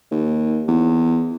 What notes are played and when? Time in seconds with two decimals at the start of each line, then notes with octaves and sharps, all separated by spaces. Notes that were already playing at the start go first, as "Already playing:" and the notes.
0.11 D#2
0.68 E2